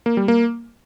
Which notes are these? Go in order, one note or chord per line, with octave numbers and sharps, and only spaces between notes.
A#3
G3
A#3